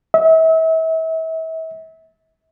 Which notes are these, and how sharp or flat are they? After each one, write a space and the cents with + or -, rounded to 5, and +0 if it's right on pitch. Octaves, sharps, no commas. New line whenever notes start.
E5 -35